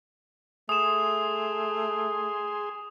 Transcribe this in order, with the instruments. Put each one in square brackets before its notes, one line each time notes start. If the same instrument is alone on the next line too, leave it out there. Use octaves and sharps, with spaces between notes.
[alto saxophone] A3 [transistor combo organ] G#4 G#5 C6 [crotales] D#6 E7